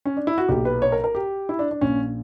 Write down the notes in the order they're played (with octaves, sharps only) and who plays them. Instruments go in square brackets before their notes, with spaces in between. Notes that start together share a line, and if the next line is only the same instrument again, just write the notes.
[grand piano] C#4
D4
E4
F#4
B1 A#2 G4
B4
C#5
A#4
A#4
G4
E4
D4
D4
A#1 A#2 C#4